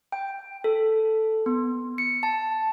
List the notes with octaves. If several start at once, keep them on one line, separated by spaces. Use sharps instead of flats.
G5
A4
B3
C#7
A5